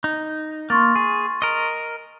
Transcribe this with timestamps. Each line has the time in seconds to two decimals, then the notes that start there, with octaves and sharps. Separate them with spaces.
0.04 D#4
0.70 A#3 C6 C#6 A6
0.96 G#4
1.42 A#4 D#5